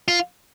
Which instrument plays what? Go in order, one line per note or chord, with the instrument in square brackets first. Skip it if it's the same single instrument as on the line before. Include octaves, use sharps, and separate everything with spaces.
[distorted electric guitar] F4